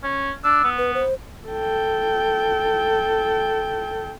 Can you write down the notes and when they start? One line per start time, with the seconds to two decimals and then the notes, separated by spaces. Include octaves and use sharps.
0.03 C#4
0.44 D4 E6
0.64 B3
0.78 B4
0.94 C5
1.49 A4 G5